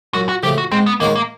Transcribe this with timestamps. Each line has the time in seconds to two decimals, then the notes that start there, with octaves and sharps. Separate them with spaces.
0.14 F#2 F#4
0.29 F#4
0.43 C#3 F3 A3 G4
0.58 F#4
0.72 G#2 C4
0.86 B3
1.00 D#3 G#3 A#3 C#4 F#4
1.15 A#3